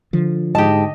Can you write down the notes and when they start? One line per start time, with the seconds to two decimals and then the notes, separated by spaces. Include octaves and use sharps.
0.13 D3 F3
0.55 G#2 G4 D#5 A5